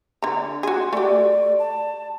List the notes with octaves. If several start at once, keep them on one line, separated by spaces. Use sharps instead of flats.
D3 A#5
F#4 G#4 C6
A3 G4 D5
A5